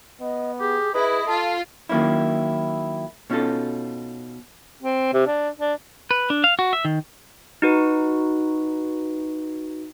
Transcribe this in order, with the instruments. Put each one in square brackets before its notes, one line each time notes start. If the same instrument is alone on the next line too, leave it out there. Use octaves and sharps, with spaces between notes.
[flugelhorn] B3 [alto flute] D#5
[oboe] G4 [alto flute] G#4
[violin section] E4 [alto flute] G#4 [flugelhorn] B4 [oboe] D#5
[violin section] F4 [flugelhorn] A4 [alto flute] A5
[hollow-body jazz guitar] D#3 F#3 A#3 C#4 E4
B2 C#4 D#4 F4 A4
[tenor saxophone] C4
C3
D4
D4
[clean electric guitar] B4
D4
F5
F#4
E5
D#3
[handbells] D#4 F#4 B4